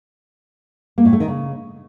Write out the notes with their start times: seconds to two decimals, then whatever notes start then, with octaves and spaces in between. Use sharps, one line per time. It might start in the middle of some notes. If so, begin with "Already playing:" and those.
0.98 A#3
1.05 A2
1.13 A3
1.20 D#3
1.28 C#3